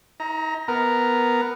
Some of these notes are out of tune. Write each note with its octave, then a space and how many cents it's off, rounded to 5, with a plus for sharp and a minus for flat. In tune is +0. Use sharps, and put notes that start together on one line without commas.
D#4 +40 A#5 +5
B3 +0 A#4 +0